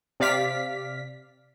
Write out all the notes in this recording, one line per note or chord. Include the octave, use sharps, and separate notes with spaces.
C3 D5 F5 B6